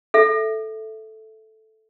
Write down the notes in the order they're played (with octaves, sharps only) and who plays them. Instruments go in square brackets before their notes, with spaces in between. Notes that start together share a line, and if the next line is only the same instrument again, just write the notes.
[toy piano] A4 E5